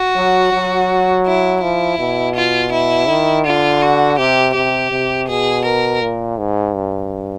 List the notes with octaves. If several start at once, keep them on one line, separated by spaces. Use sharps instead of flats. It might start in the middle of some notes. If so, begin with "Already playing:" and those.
Already playing: F#4
F#3
F#3
E4
F3 E4
B2
F4
E4
D#3
D3 F4
F#4
C3 G4
C3 G4
C3
B2 G#4
A#4
A#2
G#2
G2